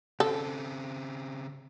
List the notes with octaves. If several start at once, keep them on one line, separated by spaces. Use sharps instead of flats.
C#3 C4 A4